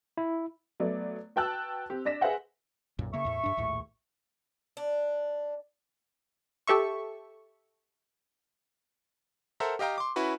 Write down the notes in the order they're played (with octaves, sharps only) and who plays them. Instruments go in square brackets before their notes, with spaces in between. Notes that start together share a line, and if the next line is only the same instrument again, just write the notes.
[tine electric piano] E4
[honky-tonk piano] F#3 A3 B3 D5
F#4 B4 G5 A5 E6 F#6
C4 G4
D4 D5 A#6 B6 E7
G#4 B4 C5 E5 F#5 G5
[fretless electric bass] B1 F#2 A#2
[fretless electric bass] C#3 A#3 [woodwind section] E5 C#6
[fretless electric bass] E2 A2
G2 D4
A#1 D#2 A2
[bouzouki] D4
[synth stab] G4 A4 E5 C#6
[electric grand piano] A4 A#4 C5 E5 F#5 A#5
G4 D#5 F5 G5 A#5
C6 D6
C#4 E4 F#4 B4